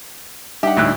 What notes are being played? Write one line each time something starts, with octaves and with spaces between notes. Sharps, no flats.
G3 D4 D#4 G4 E5 F#5
D2 A2 F#6